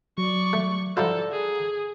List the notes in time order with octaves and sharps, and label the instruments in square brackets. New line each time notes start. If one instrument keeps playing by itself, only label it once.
[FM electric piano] F#3 [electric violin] D5 C#6
[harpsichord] A3
[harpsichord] F3 E4 F4 [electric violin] A4 [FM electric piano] D5 F#5 A#5
[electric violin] G#4